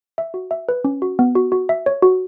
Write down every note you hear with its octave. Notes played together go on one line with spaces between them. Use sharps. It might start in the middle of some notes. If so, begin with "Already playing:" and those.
E5
F#4
E5
B4
C#4
F#4
B3
F#4
F#4
E5
C#5
F#4